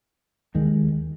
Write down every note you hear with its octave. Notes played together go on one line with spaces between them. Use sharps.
D#2 D#3 G#3